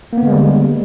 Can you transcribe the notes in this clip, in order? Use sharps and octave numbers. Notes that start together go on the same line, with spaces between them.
D3 G3 G#3 A#3 B3